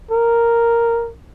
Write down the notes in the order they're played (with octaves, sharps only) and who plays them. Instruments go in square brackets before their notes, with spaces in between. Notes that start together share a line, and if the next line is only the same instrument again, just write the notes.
[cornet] A#4